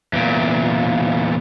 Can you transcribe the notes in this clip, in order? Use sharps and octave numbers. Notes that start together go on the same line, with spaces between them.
E2 A#2